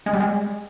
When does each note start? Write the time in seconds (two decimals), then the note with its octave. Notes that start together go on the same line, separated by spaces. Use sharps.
0.06 G#3
0.13 G3
0.20 G#3